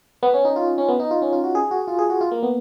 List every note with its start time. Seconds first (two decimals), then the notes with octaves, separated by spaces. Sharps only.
0.23 B3
0.34 C#4
0.45 D#4
0.56 F4
0.78 C#4
0.88 B3
1.00 D#4
1.11 F4
1.22 C#4
1.33 F4
1.44 F#4
1.55 G#4
1.71 F#4
1.87 F4
1.99 G#4
2.10 F#4
2.21 F4
2.31 A#3
2.43 B3